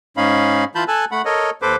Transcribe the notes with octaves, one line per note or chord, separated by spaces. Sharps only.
G#2 C#4 D#4 F5 B5
E3 F4 A5 B5 G6
A4 G#5 A5 E6 F#6
A3 F#5 B5
A4 A#4 C#5 D#5
D#2 A4 B4 C5 D6